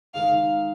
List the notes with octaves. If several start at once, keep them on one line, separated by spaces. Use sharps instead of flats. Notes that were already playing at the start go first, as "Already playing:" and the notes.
D#3 G#3 D#4 F5